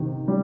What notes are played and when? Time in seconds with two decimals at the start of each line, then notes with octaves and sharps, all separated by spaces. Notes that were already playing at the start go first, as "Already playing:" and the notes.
Already playing: C3 D#3
0.28 G3